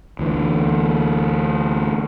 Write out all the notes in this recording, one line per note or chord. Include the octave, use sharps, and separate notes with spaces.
D2 E3